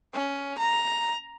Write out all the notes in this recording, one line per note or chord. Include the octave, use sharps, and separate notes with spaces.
C#4
A#5